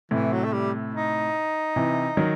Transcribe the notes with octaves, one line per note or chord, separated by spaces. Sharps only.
A2 C3 E3
F#3
A3
G3
D#4
C3 E3
D#3 F#3